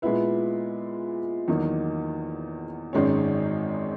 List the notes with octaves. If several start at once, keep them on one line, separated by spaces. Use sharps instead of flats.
A#2 G#3 B3 E4 B4
E2 D#3 F#3 A#3 D#4
G#1 F#2 D#3 G#3 C#4